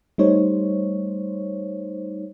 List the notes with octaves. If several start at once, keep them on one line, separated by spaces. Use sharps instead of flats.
G3 A3 D#4 C5 C#5